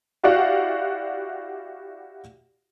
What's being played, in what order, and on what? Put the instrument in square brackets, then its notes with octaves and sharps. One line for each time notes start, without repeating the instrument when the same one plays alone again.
[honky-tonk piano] E4 F#4 G4 D5 F5 F#5